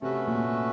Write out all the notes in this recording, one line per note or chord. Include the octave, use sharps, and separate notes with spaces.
C3 A3 C#4 F#4 B4 E5
A#2